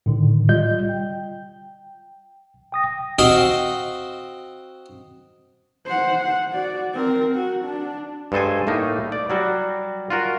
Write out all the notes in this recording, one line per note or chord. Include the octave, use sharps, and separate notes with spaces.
A2 D3 D#3
G3 F4 D#5 G6
G5
G5 D#6 A#6
C4 F#4 D#5 F5 G5
C5 F#5
F#5
F#4 D5
C4 A#4
F#4
D4
G2 G#3 A4 C5 G#5
A2 A3 A#3 D#4
D5
F#3 G3 F#4
F4 F#4 A#4